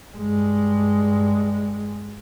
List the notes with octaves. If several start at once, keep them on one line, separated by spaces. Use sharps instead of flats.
G2 G#3